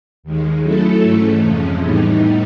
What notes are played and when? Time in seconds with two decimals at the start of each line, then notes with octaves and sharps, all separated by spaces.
0.23 D#2 D#3 G#3
0.62 F#3 A3 C#4 E4 A4
1.02 G#2 E3 A3 C#4
1.41 F2 C3 F3 G#3 C#4
1.80 A2 E3 G3 B3 D#4